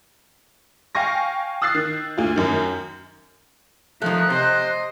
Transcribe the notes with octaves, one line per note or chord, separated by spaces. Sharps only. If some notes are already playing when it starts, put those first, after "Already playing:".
F5 G5 G#5 C#6 A#6
D#6 E6 F#6 A6 C7
D#3
D2 F4
F#2 D#3
D#3 F3 A3 F#6
C3 C5 D#5